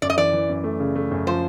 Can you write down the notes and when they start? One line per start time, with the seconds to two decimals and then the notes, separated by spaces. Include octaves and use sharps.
0.02 F#2 D5
0.10 D#5
0.17 E3 D5
0.33 E3
0.49 F#2
0.64 A3
0.80 C#3
0.96 A3
1.11 F#2
1.27 F3 C5